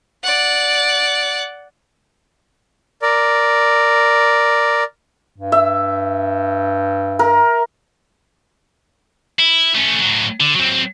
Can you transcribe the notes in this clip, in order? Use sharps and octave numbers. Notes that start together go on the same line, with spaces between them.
D5 F#5
A#4 D5
G2
E5
A#4
E4
A3 C#4
A2 F#3
D3
F#3 C4